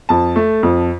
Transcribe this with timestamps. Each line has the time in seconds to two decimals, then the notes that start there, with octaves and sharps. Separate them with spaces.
0.09 F2 A5
0.36 A3
0.63 F2